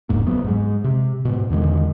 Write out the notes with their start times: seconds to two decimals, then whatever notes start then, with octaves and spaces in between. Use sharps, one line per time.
0.09 E1 C#2 G#2 A#3
0.27 F#1 F#3 B3
0.44 G#2 G#3
0.84 C3
1.25 G#2 B2
1.50 E2 D3 D#3 G#3